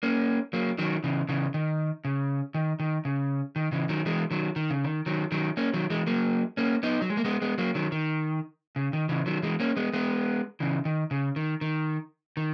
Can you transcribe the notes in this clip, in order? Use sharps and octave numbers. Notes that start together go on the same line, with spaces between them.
A#3 C#4
F#3 A#3
D#3 F#3
C#3 E3
C#3 E3
D#3
C#3
D#3
D#3
C#3
D#3
C#3 E3
D#3 F#3
E3 G#3
D#3 F#3
D#3
C#3
D#3
D#3 F#3
D#3 F#3
A#3 C#4
D#3 F#3
E3 G#3
F#3 A#3
A#3 C#4
B3 D#4
F#3
G#3
A#3
G#3 B3
G#3 B3
F#3 A#3
D#3 F#3
D#3
C#3
D#3
C#3 E3
D#3 F#3
E3 G#3
A#3 C#4
G#3 B3
G#3 B3
C#3 E3
D#3
C#3
D#3
D#3
D#3